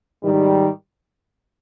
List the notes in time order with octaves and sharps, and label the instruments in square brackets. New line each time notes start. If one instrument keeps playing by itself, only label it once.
[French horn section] G#2 D#3 G3